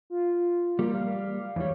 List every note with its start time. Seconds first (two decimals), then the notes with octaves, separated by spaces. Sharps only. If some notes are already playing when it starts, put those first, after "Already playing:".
0.10 F4
0.79 G3 A#3
0.95 F5
1.56 E2 G3 C#5